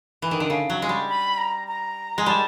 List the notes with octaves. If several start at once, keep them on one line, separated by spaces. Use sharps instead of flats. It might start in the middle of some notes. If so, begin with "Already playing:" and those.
E3
D#3
D3
C#3
F#3
G#3
G3
B5
A#5
A#5
G#3
G3 A5